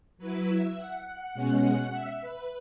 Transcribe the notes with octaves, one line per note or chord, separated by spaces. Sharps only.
F#3 E4 B4
E5
F#5
F#5
B2 G#3 C#4
E5
B4